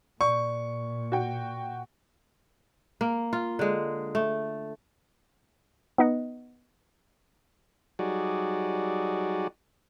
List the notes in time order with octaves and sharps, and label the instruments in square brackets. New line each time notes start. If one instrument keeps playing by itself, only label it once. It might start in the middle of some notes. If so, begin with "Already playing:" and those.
[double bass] A#2 [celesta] D5 [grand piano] C#6
[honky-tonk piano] F#4 G5
[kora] A#3
F4
D3 G#3
A3
[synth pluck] B3 D#4 D#5 F#5
[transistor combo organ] F#3 G3 D#4 F#4 G#4 D5